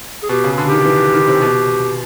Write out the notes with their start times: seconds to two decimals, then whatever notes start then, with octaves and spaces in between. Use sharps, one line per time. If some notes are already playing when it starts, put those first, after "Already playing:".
0.23 G#4
0.29 B2 G4
0.44 C#3
0.58 D3
0.67 D#3 G4
0.85 E3
1.14 D#3
1.28 C3
1.41 B2